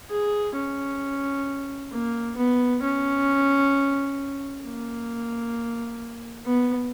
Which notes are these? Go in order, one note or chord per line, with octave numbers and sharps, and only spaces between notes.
G#4
C#4
A#3
B3
C#4
A#3
B3